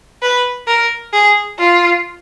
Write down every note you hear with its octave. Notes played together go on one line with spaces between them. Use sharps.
B4
A#4
G#4
F4